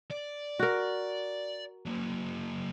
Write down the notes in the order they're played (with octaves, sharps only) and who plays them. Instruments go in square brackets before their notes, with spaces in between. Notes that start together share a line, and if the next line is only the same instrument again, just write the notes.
[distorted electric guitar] D5
[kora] F#4 A#4
[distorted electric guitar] F#3 A#3